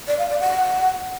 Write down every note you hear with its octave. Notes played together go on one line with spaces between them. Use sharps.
D5
F5
D5
F#5